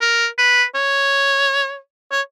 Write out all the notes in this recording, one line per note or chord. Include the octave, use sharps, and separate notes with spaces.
A#4
B4
C#5
C#5